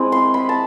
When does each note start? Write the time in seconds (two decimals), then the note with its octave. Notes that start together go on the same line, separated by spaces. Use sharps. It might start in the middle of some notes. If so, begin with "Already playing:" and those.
Already playing: G#3 C4 E4 D#6
0.12 C6
0.34 B5
0.49 A5